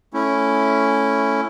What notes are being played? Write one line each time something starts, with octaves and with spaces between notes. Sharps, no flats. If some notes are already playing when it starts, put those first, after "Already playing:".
A3 C#4 E4